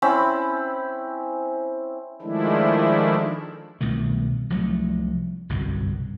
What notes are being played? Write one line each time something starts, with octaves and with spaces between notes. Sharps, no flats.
C4 C#4 E4 B5
D#3 F3 G#3 A3 D4 E4
C2 B2 D#3 A3
C2 F3 F#3 A3
G1 C2 F#2 B2